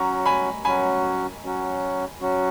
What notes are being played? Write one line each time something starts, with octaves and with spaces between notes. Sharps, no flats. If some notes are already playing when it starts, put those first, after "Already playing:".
Already playing: F#3 C#4 F#4 A#5 C#6
G#5 B5
F#3 C#4 F#4 G#5 B5
F#3 C#4 F#4
F#3 C#4 F#4